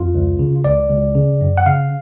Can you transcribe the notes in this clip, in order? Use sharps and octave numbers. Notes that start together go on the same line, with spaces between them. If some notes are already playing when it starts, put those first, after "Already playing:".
Already playing: F2 F4
C#2
C#3
C#2 D5
C#2
C#3
F#2
F#5
C#3 F5